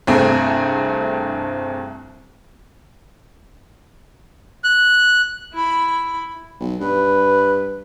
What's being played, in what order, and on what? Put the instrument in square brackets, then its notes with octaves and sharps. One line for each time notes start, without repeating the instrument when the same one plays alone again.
[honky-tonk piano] C2 G2 A3 C4 G#4
[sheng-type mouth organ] F#6
[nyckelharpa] E4 B5
[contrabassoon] B1
[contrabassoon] G2 [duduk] B4